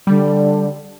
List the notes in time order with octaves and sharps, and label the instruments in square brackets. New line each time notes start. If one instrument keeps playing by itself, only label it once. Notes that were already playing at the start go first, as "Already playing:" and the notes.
[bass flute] D3 [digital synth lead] G3